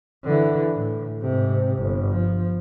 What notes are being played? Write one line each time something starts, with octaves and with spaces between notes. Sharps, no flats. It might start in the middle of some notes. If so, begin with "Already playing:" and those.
D3 E3
A2
G#2 C3
G1
F3